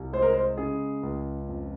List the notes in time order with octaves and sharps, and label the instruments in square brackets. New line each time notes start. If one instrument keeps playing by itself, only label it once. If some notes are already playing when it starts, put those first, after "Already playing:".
Already playing: [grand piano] C2
G#3 C5
A#4
C5
C#3 G#4
C#2
F2